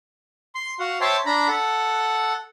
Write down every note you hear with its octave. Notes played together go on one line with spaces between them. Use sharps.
C6
F#4 F5 F#5
C5 C#5 E5 G5 A5 C6
D4 A#5 B5
A4 F#5